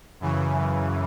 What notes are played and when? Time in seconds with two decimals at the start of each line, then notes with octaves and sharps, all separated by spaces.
0.20 F#2 C#3 E3